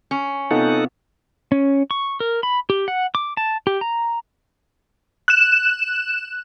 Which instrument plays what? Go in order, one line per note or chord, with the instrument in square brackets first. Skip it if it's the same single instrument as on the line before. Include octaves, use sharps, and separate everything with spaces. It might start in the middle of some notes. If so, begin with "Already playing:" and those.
[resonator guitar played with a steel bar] C#4
[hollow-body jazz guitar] C3 B3 F4 [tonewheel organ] D#4 A4 F#5
[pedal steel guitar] C#4
C#6
A#4
B5
G4
F#5
D6
A5
G4
A#5
[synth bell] F#6 E7